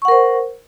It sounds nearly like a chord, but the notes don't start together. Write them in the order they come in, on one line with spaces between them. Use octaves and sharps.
C#6 F#5 A#4 C5